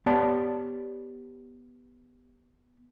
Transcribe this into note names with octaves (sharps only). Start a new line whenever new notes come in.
B3 G4 C#5 D5 A5